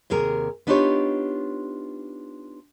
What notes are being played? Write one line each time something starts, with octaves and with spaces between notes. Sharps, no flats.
D#2 C3 G#4 A#4
B3 D4 D#4 F4 G4 C#5